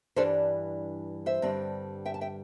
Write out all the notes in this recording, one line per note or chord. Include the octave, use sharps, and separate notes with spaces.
G2 E3 G3 D4 A4 C5
C5 E5
G2 D3 G3 C4
E5 G5
A5
E5 G5